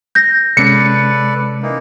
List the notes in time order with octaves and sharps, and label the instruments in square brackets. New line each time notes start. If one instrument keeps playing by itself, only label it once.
[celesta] G6 A#6
[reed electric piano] C3 G#3 C#4 [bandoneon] A4 B4 D5 [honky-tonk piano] C#7
[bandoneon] E3 A#3 D#4